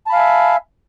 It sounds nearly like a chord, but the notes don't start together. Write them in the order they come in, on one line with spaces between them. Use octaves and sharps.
A5 B5 F5 G#5 E5